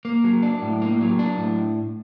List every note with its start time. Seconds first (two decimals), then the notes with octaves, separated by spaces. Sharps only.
0.05 A#3
0.24 F#3
0.43 D4
0.62 A2
0.82 A#3
1.01 F#3
1.19 D4
1.38 A2